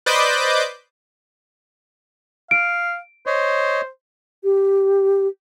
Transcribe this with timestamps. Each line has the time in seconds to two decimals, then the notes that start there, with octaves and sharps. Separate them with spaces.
0.06 B4 C5 D5 D#5 D6 G6
2.51 F5 D7
3.26 C5 C#5 D#5
4.44 G4